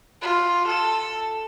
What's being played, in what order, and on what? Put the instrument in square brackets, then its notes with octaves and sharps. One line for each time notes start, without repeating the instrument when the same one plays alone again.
[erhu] F4
A4